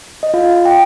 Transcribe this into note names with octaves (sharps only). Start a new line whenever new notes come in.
D#5
F4 F5
G5